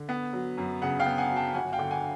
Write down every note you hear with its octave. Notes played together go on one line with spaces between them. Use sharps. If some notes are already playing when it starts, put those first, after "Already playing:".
Already playing: D3
B3
F#3
F#2
C#3 F#5
F5 G5
B3
F#5 G#5
F#3
G5 A5
G1 F#5 G#5
F5 G5
D3
F#5 G#5